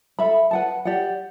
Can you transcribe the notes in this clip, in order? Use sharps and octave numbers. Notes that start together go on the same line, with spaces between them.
A4 E5 B5
B4 F#5 A5
G4 D5 F#5